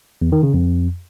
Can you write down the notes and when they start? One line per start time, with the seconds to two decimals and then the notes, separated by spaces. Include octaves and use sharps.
0.22 E2
0.32 D#3
0.43 C#3
0.54 F2